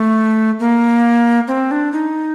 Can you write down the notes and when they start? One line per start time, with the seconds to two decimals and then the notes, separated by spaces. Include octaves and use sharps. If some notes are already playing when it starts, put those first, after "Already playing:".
Already playing: A3
0.60 A#3
1.48 C4
1.71 D4
1.92 D#4